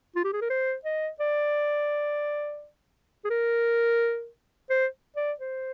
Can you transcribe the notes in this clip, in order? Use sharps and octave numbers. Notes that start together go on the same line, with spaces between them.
F4
G4
G#4
A#4
C5
D#5
D5
G#4
A#4
C5
D5
C5